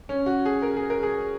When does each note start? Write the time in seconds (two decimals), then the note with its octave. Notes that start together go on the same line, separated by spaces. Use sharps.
0.09 C#4
0.26 F#4
0.45 G#4
0.62 A#4
0.76 G#4
0.90 A#4
1.03 G#4